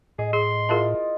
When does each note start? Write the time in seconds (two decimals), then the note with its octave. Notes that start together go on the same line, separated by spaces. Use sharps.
0.19 A2 G#4 D#5
0.33 G#4 C6
0.69 E4 F4 G#4 A#4 D#5 A5